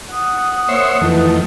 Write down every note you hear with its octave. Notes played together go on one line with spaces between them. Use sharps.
F#5 D#6
A#3 C5 C#5 E5
F2 D#3 E3 A3